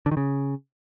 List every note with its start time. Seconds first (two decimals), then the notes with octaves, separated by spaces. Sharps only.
0.06 D3
0.11 D#3
0.17 C#3